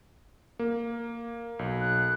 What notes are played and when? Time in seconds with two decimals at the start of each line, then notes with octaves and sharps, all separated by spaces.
0.59 A#3
1.59 B1
1.81 F#6